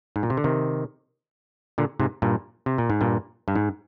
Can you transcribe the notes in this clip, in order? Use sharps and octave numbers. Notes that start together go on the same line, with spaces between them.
G#2
A#2
C3
D3
C3 D#3
A#2 D3
G#2 C3
G2 A#2
C3
A#2
G#2
G2 A#2
G2
G#2